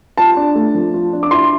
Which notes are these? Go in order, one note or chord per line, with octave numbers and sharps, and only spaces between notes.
F4 A5
D4
A3
F3
F4
D4
D6
E4 C6